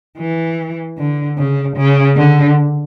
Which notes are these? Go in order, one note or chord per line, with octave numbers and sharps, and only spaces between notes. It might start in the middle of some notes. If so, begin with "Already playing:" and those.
E3
D3
C#3
C#3
D3